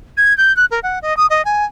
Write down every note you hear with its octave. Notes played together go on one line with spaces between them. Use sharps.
G#6
G6
F#6
A#4
F#5
D#5
D#6
D#5
G#5